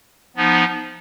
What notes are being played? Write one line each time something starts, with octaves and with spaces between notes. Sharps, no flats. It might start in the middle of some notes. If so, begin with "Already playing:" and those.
F3 B3 D#4